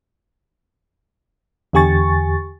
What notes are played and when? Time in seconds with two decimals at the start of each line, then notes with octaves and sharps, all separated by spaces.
1.73 E2 D3 G4 G#5 C#6 A6